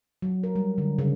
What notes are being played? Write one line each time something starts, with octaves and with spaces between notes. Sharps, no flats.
F#3
A#4
G3
D3
C#3